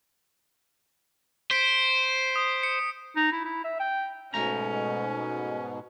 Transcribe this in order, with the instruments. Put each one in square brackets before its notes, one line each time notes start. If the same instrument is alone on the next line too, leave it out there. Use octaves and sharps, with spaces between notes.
[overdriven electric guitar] C5 [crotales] B6 D7
[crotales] D#6
C#7
[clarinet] D#4
E4
E4
E5
G5
[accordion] G#2 B2 [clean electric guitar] A3 A#5 [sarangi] C#4